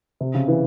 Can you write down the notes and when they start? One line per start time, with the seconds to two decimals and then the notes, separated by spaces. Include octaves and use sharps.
0.21 C3
0.35 C#3
0.48 E3